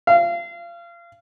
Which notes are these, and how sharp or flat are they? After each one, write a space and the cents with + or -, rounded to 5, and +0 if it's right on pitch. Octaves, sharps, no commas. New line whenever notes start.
F5 -30